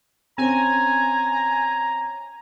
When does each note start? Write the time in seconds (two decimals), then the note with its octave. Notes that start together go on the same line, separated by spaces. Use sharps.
0.38 C4 C#4 G#5 A#5